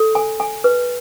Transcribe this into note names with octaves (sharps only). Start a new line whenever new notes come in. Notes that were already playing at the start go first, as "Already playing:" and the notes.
Already playing: A4
G#5
G#5
B4